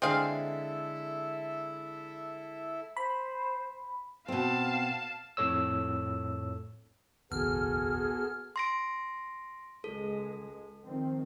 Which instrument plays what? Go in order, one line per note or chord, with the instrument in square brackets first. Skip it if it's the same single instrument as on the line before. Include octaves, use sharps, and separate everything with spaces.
[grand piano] D3 G#3 [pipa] C4 G#4 F5 [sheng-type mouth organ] E4 A4 E5
[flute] C5 [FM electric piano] B5
[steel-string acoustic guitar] B2 C4 [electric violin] F5 A5
[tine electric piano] F2 A2 A4 C#5 E6
[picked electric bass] F1 A#1 D#2 [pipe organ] B3 F#4 A4 [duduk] G#4 [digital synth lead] F6
[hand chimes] C6 A#6 D7
[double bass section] C#2 G#3 [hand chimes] A4
[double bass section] D#3 F3 C4